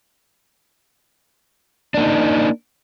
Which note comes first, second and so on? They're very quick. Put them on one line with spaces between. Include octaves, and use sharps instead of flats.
D4 A#3 D#4